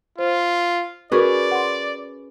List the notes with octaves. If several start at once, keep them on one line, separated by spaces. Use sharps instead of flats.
F4 C5
C#4 F#4 G#4 A#4 B4 D5
F#5 C6